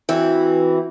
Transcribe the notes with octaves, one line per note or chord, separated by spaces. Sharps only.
E3 C4 F#4